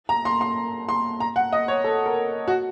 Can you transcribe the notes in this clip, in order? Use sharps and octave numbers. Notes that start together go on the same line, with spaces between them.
A#5
C6
C6
C6
A#5
F#5
D#5
C#5
A4
A#4
F#4